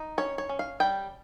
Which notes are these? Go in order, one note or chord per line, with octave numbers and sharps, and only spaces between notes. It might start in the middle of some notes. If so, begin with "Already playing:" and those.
Already playing: D#4
C#4 C#5
C#5
C#4
F5
G3 G5